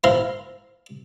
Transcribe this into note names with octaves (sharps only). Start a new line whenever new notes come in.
E4 C5 F5 A#5 C6